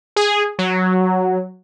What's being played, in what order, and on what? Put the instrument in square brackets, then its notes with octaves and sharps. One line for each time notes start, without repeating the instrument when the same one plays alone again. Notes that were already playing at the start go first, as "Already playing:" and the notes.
[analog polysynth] G#4
F#3